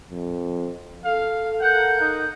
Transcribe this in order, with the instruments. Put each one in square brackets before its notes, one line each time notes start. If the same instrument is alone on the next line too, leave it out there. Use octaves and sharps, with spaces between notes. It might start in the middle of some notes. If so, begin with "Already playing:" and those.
[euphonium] F2
[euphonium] A4 [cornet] F5
[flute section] A#4 G6 [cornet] F#5
[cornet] D#4